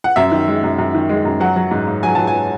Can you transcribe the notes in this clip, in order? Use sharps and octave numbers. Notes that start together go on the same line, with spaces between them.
F#5
F#2 E5
D#3
G#3
F#2
F#2
D#3
G#3
F#2
F#3 F#5
F#3
G#2
G#2
F#3 G#5
F#3 A5
G#5